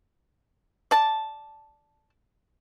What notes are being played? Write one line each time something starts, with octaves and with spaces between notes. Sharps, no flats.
D5 A5